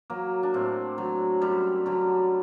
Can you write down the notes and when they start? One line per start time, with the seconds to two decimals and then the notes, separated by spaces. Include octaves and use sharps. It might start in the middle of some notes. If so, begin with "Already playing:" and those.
0.10 F#3 A#3
0.43 D4
0.54 A2 C4
0.98 F#3
1.41 F#2 G3
1.86 D3 F#3